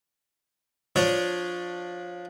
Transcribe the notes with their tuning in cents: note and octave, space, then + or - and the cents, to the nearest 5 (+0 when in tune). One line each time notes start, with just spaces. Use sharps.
F3 +15 D4 +0 C#5 +0